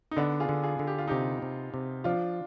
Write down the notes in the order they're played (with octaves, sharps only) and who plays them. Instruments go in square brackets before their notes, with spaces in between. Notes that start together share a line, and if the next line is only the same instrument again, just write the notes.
[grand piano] D#4
[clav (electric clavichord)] D3 [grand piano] B3 D4
[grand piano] F4 G#4
[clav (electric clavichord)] D3
[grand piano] F4 G#4
[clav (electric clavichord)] D3
[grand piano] G4
F4
[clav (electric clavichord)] C3 [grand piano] D#4 G4
[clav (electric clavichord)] C3
C3
[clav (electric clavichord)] F3 [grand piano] D4 F4